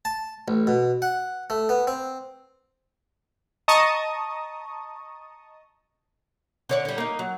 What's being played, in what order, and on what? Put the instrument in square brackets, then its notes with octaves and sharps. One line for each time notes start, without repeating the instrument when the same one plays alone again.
[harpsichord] A5
A1
B2
F#5
A3
B3
C4
[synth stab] D#5 A5 A#5 C#6 D#6
[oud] D3 C#5 D5
D3 G3
A#3 D#4
F#3